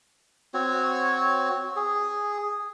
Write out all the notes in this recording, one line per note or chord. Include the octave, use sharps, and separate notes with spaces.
C4 F#4 C#5
G#4